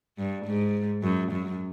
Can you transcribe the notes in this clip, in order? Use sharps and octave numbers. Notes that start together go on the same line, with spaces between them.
G2
G#2
F#2
F#2